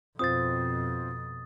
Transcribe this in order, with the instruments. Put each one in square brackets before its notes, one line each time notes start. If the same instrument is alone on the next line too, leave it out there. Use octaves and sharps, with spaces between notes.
[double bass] F2 B2 [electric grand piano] C4 F4 C5 [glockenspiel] D#6 A6